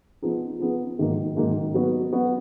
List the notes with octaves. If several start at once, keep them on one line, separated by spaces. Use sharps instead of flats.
F3 B3 D#4 G#4
F3 B3 D#4 G#4
G#2 D#3 F#3 A#3
G#2 D#3 F#3 A#3
F#3 B3 F#4
F#3 B3 F#4